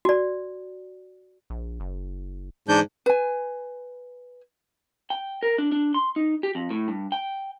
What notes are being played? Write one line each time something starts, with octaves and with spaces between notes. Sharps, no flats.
F#4 D5
A#1
F#1
G#2 E3 D4 G6
B4 G#5
G5
A#4
D4
D4
C6
D#4
G4
F2
A2
G2
G5